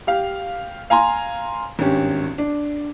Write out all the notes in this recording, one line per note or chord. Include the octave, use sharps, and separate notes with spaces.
G4 F5
F5 G#5 A#5 C6
G#1 G2 C#4 G4
D4